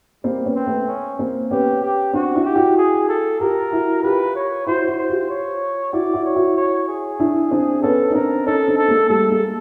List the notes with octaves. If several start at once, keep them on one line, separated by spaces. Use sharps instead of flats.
G3 A#3 C4
B3 C#4
C4
A3 B3
C#4
A#3 C4
B3 C#4 G4
G4
C4 D4 F#4
D4 E4
G4
E4 F#4
G#4
A4
F4 G4 A#4
E4 F#4
F4 G4 B4
C#5
E4 F#4 C5
E4 F#4
C5
F4 G4
C#5
E4 F#4 D5
E4 F#4
C#5
E4 F#4
C#5
G#4
D4 E4
C4 D4
B3 C#4 A4
D#4
C4 D4 A#4
C#4 D#4 A4
C4 D4
A4
G#3 A#3
G3 A3 A4
G#3 A#3